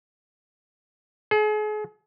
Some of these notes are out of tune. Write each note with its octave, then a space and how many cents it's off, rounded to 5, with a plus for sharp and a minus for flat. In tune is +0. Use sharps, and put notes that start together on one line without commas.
G#4 +40